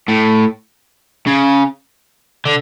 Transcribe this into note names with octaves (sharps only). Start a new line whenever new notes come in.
A2
C#3
D3